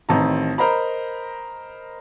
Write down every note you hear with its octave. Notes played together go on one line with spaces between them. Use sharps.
A1 D#3 C4 A5 A#5
A#4 C5 D#5 A#5 B5